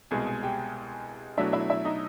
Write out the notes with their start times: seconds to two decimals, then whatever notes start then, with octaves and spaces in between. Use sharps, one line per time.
0.11 C2 B2 G#3 G#4 G#5
0.27 G#4 G#5
0.43 G4 G5
1.37 B2 F#3 A3 D4 E4 E5
1.53 E4 E5
1.70 E4 E5
1.85 D#4 D#5